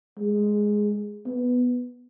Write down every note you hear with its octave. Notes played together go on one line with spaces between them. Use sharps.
G#3
B3